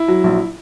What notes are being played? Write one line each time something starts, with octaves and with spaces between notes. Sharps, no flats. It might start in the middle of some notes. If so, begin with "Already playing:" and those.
Already playing: E4
F#3
A#1